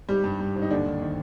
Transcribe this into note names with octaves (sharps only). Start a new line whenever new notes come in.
G#1 G3 G4
G2
G2
G#1
D#4
D#2 D3 D4
D#3
D#3